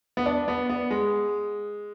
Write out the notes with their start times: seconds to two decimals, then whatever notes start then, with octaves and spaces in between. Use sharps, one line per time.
0.17 B3
0.26 D4
0.48 B3
0.69 B3
0.91 G#3